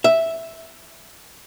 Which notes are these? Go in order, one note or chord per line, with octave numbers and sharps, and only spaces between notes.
E5